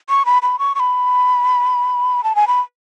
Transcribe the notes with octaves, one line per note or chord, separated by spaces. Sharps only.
C#6
B5
B5
C#6
C#6
B5
A5
G#5
B5